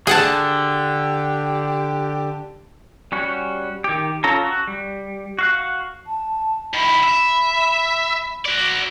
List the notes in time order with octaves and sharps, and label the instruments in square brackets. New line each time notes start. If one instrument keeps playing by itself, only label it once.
[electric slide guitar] D3 [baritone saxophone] G4 [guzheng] G#4 F#5 A5
[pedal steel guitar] G3 C#4 F#4
D#3 G4
C#4 F4 A4 A#5
F#4
G3
F#4 F5 F#5
[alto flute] A5
[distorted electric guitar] D#3 E4 [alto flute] B5
[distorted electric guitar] E5
F#4 D5